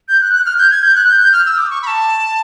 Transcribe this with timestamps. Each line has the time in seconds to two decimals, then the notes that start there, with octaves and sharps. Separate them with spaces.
0.09 G6
0.21 F#6
0.33 F#6
0.46 F6
0.58 G6
0.71 G#6
0.83 G6
0.95 F#6
1.09 G6
1.20 G6
1.32 F6
1.46 E6
1.58 D6
1.70 C#6
1.82 B5
1.87 A5